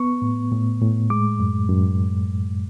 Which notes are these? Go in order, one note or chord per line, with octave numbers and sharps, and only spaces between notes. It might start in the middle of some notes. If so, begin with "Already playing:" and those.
Already playing: B3 C#6
A2
A2
A2
G#3 D6
F#2
F#2